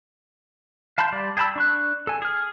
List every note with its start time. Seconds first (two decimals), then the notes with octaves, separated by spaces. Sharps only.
0.98 F5 A5 B5 C6 G6
1.12 G3 D5
1.37 G#4 G5 A5 B5 E6
1.56 D4 C#6 F#6
2.07 A4 G#5
2.22 G#4 F6